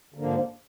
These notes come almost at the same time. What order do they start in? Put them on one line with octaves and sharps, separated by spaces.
D3 A#3 F3 G#2